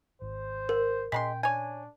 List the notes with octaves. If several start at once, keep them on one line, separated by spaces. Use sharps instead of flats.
G#1 C5
A#4
A#2 G#3 C#4 G5 B5 C6 B6
D4 C#5 G#5